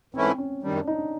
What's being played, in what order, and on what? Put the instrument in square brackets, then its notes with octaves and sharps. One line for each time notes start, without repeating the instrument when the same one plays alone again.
[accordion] G#2 E3 A3 C#4 E4 [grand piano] C4
[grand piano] C#4
[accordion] F#2 D#3 G3 [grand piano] D4
[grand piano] D#4
D4